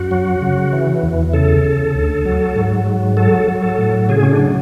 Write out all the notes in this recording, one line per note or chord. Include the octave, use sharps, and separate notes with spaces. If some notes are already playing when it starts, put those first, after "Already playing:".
Already playing: F#2 F#4
F#3
C#3
E3
E2
C#3 A4
C#3
D2
F#3
G#2
F#3
F#3 A4
F#3
A4
A2
C#3 G#4
C#4
D4
F#3